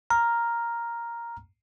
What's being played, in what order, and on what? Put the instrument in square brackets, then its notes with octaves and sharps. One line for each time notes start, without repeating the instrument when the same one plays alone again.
[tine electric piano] A#5 F6